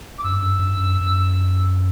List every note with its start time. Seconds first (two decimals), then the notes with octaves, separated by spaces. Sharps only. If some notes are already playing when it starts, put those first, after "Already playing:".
0.18 D6
0.24 F#2 E6
0.32 G2
0.42 F#2
0.50 G2
0.59 F#2
0.67 G2
0.76 F#2
1.01 F#2